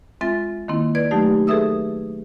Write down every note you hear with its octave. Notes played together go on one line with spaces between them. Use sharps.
G#3 C4 F4 E5 A6
D#3 A#3 C4 E4
B4 D5 G#6
F#3 A3 D#4 G4
G#4 A4 B4 E5 D#6 E6